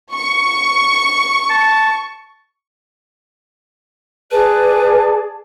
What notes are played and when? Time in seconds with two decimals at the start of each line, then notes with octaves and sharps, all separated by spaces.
0.13 C#6
1.50 A5
4.31 G#4 B4 D5 A5